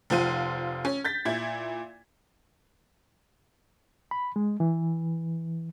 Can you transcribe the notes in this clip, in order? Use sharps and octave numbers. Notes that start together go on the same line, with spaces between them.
F1 F3 F4 D#7
C#4
G6 A6 B6
A#2 E4 G#6
B5
G#3
E3